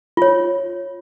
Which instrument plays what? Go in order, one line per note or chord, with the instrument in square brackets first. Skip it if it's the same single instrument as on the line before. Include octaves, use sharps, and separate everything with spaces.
[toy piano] F4 C#5